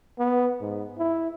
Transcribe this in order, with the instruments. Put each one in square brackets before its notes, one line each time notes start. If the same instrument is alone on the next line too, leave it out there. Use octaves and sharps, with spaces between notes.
[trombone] B3
G#2
E4